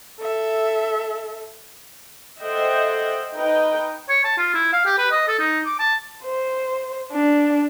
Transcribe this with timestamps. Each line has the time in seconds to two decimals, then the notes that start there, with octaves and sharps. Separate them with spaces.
0.20 A4 E5
2.42 A4 C5 D#5 E5 F#5 G5
3.34 D#4 B4 D#5 G5
4.09 C#5
4.24 A5
4.37 F4
4.54 E4
4.73 F5
4.85 G4
4.98 B4
5.11 D#5
5.28 A4
5.39 D#4
5.66 D6
5.79 A5
6.24 C5
7.12 D4